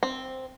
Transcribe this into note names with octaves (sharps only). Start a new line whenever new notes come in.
C4